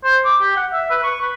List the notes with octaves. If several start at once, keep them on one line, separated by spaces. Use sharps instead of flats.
C5
D6
G4
F#5
E5
B4
C#6
B4